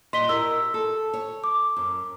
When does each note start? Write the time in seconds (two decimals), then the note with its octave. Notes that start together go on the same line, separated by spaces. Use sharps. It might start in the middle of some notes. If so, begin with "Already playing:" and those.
0.13 A#2 D#5 C6 B6 G7
0.29 E4 G4 A#4 E6
0.74 A4
1.13 C#5
1.44 D6
1.77 F#2